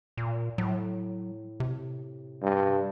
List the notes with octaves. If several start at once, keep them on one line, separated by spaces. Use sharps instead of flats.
A#2
A2 F#3
C3
G2